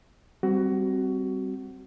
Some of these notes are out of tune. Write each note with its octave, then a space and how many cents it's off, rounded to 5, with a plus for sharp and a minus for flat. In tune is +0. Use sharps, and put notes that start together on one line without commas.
G3 +0 C4 +0 F#4 +20